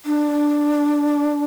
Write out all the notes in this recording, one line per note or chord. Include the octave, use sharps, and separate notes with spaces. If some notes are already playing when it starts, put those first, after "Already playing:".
D4